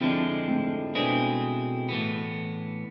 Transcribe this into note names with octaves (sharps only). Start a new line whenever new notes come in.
F2 D3 F3 G#3 C4 D4 E4
A3 C4
B2 G#3 B3 C4 D4 E4 G#4
A2 E3 B3